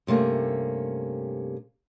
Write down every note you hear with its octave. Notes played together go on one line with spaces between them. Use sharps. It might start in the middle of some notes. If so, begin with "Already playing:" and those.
G2 C3 A3 A#3 C#4